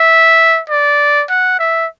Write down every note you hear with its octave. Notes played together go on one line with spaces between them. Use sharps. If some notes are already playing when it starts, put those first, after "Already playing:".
Already playing: E5
D5
F#5
E5